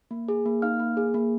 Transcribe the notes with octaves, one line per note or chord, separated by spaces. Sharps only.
A#3
G#4
A#3
D#4 F5 F6
A#3
G#4
A#3